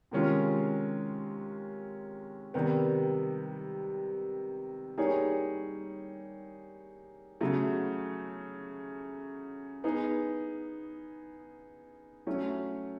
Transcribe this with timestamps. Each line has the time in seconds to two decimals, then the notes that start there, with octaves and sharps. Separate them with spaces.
0.11 C3 D#3 G#3 C#4 F4
2.54 C3 D#3 G3 B3
4.98 G3 A#3 D#4 G#4 C#5
7.41 C#3 F#3 A3
9.84 B3 D#4 G#4
12.27 F#3 A3 C#4